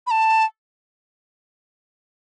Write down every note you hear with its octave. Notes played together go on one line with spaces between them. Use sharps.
B5
A5